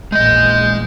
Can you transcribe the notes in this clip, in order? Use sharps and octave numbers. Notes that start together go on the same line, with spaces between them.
A#1 E2 G#3 D#5 G6